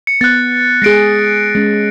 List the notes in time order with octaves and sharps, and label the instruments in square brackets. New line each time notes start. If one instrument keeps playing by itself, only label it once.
[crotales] C#7
[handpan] B3 [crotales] F#6 A6
[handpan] G#3 G#4 [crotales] A#6 C7 D7
[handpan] G#3 C#4